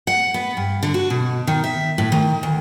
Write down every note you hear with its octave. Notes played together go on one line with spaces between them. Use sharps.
F#5
B3
G2
D3
F#4
B2
D#3
E5
A2
D#3
D2